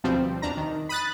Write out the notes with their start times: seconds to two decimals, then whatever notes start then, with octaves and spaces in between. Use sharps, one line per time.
0.04 D2 B2 F3 G3 C4
0.42 E2 D4 A#5
0.57 D#3
0.89 B5 D#6 F#6 A6